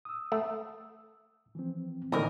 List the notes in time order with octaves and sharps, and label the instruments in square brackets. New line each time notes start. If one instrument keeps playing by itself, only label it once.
[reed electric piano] D#6 E6
[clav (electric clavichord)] A3
[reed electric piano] E3 F3 C4
[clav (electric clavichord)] A#1 A2 [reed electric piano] D3 E3 D#4 [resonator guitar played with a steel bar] A#4 D#5